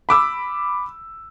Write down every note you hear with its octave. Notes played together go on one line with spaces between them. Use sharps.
B5 D6 E6